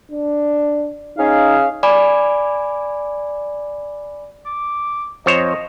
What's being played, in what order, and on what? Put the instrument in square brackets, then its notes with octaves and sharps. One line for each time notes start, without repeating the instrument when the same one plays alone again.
[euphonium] D4
[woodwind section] C#4 G#4 F5 [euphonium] D#4
[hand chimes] D5 G#5 B5 D6
[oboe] D6
[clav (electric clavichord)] F2 C5 C#5 [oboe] D#5